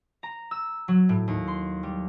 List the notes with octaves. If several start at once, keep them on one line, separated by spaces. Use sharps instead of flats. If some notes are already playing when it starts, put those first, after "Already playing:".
A#5
E6
F#3
A2
D#2
C6
G3